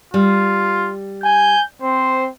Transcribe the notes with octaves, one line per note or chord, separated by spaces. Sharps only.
G3 F4
G#5 G6
C4 C5